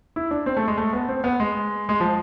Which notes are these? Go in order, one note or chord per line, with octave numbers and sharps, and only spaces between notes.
E4
D4
C4
A3
G#3
A3
B3
C4
B3
G#3
G#3
F3